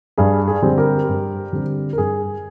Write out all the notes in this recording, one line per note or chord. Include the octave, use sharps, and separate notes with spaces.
G2 G#4
G#4
D3 G3 C4
G4 A#4
G2
D3 G3 C4
A#4
G2 G#4